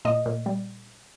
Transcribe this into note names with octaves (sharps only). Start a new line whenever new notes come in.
A#2 D#5
A#2
G3